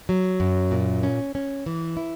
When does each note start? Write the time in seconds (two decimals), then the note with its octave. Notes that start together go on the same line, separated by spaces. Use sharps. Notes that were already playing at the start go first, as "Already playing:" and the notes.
0.09 F#3
0.40 F#2
0.71 A#2
1.03 C#4
1.35 C#4
1.66 E3
1.97 E4